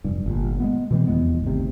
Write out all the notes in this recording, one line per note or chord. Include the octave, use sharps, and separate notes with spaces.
F1 G2
G1 A#2
G#3 A3 B3
B2 E3 G#3 C4
F1 E2 G#3 B3
G#1 D2 C3